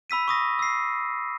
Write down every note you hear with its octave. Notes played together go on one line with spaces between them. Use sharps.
B5 E6 B6 D#7
C#6 D#6 A#6
E6 C7